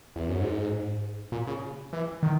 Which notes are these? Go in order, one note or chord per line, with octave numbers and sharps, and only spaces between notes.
E2
F#2
G#2
A#2
C#3
E3
D#3